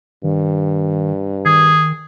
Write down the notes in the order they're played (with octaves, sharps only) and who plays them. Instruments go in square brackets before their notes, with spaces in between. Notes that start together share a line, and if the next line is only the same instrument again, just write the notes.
[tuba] G2 [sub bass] D#3
[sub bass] D#3 [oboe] G#4